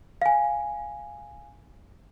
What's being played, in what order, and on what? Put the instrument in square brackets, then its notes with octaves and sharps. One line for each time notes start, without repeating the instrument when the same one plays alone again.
[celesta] F5 G#5